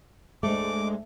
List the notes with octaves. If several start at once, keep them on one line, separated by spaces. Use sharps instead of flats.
D2 G#2 G#3 A3 D6